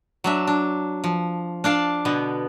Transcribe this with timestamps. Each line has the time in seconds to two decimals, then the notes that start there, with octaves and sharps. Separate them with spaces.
0.24 F#3 D4 E5
0.47 D4
1.04 F3
1.64 D4 D5 F5 A5
2.05 B2 D3 B3